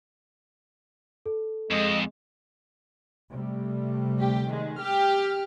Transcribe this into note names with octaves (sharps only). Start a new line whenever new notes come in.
A4
F2 G#3 D#5
C3 G3 A3
D2 G4
D#3 G#3
G4 F6